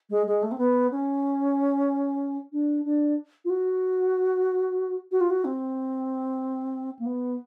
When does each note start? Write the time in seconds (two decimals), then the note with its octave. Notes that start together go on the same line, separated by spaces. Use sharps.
0.10 G#3
0.27 G#3
0.43 A3
0.52 C4
0.58 B3
0.91 C#4
2.52 D4
2.85 D4
3.45 F4
3.50 F#4
5.12 F#4
5.21 F4
5.30 F#4
5.45 C4
6.99 A#3
7.06 B3